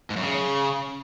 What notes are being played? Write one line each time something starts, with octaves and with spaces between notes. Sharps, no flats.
G#2
F#2
C#3